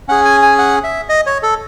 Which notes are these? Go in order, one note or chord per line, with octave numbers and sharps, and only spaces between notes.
C#4 G#4 F#5
G#5
G#5
F#5
E5
D#5
C#5
A4